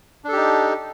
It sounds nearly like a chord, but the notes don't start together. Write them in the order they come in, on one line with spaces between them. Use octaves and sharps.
D4 A4 G4 D#4